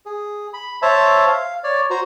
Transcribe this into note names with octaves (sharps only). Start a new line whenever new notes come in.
G#4
B5
C5 C#5 E5 A5
F5
C#5 D5
F#4 C5 A#5